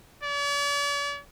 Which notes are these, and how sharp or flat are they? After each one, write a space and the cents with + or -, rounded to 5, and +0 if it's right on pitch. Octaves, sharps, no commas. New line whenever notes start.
D5 -45